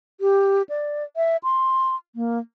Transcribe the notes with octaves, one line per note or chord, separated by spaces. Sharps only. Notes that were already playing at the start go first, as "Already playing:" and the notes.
G4
D5
E5
C6
A#3